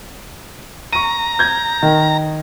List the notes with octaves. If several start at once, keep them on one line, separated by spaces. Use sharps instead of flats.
A#5 C#6 D#7
G6 G#6
D#3